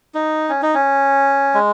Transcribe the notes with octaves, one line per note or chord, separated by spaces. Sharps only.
D#4
C#4
D#4
C#4
G#3